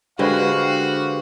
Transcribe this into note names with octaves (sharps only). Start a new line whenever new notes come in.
D3 G#3 F#4 G4 B4 C5 F5